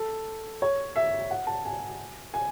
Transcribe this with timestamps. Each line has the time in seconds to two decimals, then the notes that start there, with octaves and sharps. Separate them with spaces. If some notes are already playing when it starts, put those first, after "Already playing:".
Already playing: A4
0.62 C#5
0.96 E5
1.30 F#5
1.47 A5
1.65 G#5
2.34 G#5